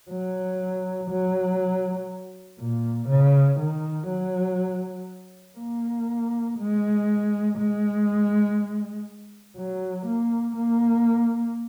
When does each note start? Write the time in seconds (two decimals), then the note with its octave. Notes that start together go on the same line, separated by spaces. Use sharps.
0.11 F#3
1.11 F#3
2.60 A#2
3.09 C#3
3.60 D#3
4.09 F#3
5.58 A#3
6.59 G#3
7.58 G#3
9.57 F#3
10.06 A#3
10.57 A#3